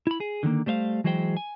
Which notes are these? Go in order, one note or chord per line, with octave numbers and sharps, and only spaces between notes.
E4 B5
G#4
D3 D#3 F#3 A#3
G3 A3 C5 E5 F5
E3 F#3 G#3 G#4 C5 G5
G#5